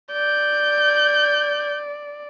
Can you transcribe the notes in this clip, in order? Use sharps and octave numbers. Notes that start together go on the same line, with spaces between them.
D5 G6